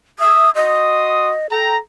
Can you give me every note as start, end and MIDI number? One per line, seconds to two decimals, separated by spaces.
0.19 0.48 76
0.19 0.50 87
0.55 1.32 66
0.55 1.47 75
0.55 1.32 84
0.55 1.32 87
1.50 1.76 69
1.50 1.77 79
1.50 1.77 82